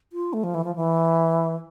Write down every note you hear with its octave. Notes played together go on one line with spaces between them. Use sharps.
F4
A3
F3
E3
F3
E3